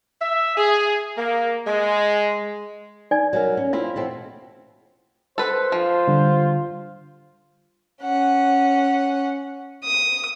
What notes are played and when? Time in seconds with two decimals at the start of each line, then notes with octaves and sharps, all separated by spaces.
0.21 E5
0.57 G#4
1.17 A#3
1.67 G#3
3.11 D#4 D5 G#5
3.33 F#3 G3 A#4
3.57 C#4
3.73 C4 E4 F4 F5
3.96 B2 E3 C4
5.38 A4 B4 C5
5.72 F3 F4
6.07 D3 G3
8.02 C#4 F#5
9.83 D#6